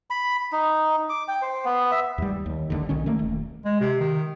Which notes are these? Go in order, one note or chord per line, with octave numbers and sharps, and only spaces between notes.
B5
D#4
D6
G5
C5
B3
E5
D#2 G3
D#2
G1 D#2 D3
B1 D#3 C#4
D#3 A3 A#3
D#1
G#3
C3
D#3